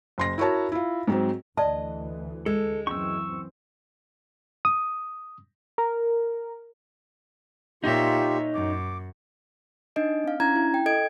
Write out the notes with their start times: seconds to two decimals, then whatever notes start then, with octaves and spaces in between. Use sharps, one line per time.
0.18 F#1 C6 A#6
0.38 E4 F#4 A#4 C#5 A5
0.72 E4 F4
1.08 G#2 F#3 C4
1.57 D2 E3 D5 D#5 A5
2.46 G#3 A4
2.87 F#2 E3 C4 C#4 C#6 E6
4.65 D#6
5.78 A#4
7.84 A#2 D#4 F4 G4 C#5 E5
8.55 F#2 D6
9.96 D4 D#4 D#5 D7
10.24 C4 F5
10.40 C#4 D4 E4 A#5 G#6
10.56 E4
10.74 G5
10.86 A4 D#5 G#6 D7